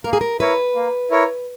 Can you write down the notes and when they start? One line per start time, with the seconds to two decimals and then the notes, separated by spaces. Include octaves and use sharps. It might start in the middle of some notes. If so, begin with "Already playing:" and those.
0.04 A#3 A#4
0.13 G#4
0.21 A#4
0.40 E4 A#4 B4 C#5
0.75 A#3
1.11 E4 A#4 C#5